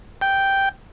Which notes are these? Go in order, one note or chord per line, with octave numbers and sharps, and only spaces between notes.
G5